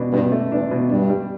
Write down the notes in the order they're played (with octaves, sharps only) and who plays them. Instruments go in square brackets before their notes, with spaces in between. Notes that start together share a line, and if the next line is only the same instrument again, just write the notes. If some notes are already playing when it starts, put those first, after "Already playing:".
Already playing: [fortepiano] B2 D4
[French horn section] G2 [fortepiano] B2
[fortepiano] A3
[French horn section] E2 [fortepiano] D4
[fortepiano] B2
[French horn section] G2 [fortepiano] D4
[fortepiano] G3